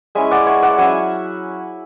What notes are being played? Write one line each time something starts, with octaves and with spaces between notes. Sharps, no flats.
G#3 C#4 E4 E5 G#5
D5 F#5
C#5 E5
D5 F#5
F#3 C#4 E4 E5 G#5